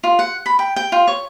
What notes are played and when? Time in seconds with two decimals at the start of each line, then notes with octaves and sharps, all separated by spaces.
0.04 F4
0.19 F#5
0.46 B5
0.59 G5
0.76 G5
0.92 F4
1.08 C#5